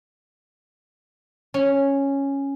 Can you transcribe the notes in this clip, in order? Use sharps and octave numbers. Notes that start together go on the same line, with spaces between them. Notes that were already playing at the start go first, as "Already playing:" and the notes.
C#4